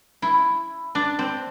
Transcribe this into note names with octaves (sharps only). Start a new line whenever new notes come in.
E4
D4
C4